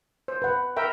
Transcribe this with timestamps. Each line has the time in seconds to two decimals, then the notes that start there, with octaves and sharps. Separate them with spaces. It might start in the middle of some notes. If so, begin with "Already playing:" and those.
0.28 C5
0.42 B4 F#5
0.77 A#4 E5 G5